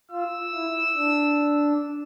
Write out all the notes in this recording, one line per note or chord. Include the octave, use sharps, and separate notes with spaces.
F4 E6
E4
D4